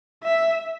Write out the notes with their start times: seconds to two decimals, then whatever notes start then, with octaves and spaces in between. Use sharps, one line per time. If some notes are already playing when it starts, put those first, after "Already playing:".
0.23 E5